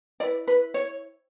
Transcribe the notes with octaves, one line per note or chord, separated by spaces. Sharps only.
E4 B4 D5
B4
C#5